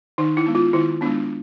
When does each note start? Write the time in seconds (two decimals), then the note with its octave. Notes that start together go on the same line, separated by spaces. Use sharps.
0.18 D#3 D#4
0.37 E4
0.47 G#3 B3
0.55 F4
0.73 D#3 E4
1.01 B3 D4
1.05 G#3